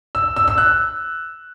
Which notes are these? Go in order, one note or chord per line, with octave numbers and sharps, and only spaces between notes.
E6
E6
E6
F#6